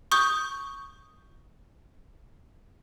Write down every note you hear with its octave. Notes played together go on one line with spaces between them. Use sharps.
C#6 D#6 G6